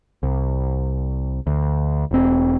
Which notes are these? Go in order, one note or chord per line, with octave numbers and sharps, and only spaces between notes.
C2
D2
E1 C4